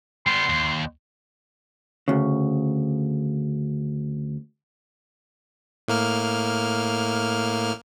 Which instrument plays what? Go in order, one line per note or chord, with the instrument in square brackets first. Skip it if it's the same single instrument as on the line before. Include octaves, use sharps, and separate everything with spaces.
[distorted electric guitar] G3 B3 [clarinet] C6
[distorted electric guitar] D#2
[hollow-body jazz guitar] D2 C#3
[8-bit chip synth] A2 A#3 F6